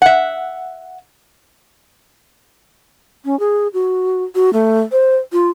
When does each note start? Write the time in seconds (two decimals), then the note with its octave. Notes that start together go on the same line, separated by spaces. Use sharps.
0.02 E5 F#5
3.25 C#4
3.40 G#4
3.74 F#4
4.35 F#4
4.53 A3
4.92 C5
5.32 F4